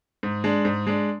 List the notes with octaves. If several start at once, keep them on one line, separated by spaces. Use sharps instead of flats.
G#2
G#3 D4
G#2
G#3 D4